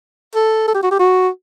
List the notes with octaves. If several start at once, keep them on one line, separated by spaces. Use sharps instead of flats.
A4
A4
G4
F#4
G4
F#4